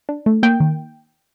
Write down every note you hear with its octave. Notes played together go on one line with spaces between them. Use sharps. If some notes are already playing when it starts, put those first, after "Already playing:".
D4
A3
A#3 G5
D#3